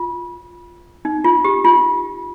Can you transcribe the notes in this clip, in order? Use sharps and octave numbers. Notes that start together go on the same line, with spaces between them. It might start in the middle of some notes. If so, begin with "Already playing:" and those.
Already playing: F4
D#4
F4
G4
F4